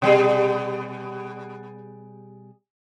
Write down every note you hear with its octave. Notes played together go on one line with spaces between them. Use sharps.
B2 G3 G#4